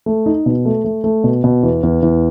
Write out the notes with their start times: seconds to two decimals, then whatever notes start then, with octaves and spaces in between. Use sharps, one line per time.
0.06 A3
0.26 D#4
0.46 B2
0.65 A3
0.84 A3
1.04 A3
1.24 B2
1.44 B2
1.63 E2
1.83 E2
2.02 E2